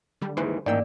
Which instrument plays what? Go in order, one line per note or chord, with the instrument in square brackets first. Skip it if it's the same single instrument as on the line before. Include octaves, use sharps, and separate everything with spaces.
[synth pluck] D3 G3
[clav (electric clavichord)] D#2 G#2 E3 [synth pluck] G#4 B4 C5
[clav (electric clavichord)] A1 D#3 G5 [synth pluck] G#2 A#3 E6 [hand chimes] D5